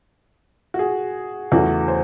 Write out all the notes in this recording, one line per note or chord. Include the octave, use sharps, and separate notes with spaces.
F#4
G#4
E2 C#3 E3 A3 F#4
C5